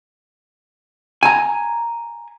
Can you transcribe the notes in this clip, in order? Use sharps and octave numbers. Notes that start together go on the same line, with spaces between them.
G#5 A#5